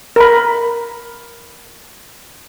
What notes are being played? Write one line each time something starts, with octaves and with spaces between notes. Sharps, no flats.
A#4 B5